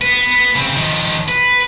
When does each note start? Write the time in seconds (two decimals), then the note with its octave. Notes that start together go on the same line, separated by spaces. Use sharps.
0.02 B3 B4
0.56 C#3 C4
0.77 D#3 F3
1.28 B4